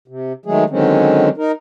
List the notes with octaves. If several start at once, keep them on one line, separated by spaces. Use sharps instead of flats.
C3
D#3 F#3 G#3 A3 G#4
D3 D#3 F#3 G#3 C4 C#4
D#4 A#4